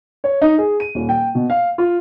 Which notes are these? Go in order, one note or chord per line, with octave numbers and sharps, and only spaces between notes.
C#5
D#4
G#4
D#7
D#1
G5
B2
F5
F4